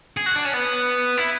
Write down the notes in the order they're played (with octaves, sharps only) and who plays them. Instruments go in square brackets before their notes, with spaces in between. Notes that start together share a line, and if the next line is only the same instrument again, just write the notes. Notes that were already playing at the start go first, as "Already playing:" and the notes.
[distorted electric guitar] G#4
F#4
D4
C#4
B3
E4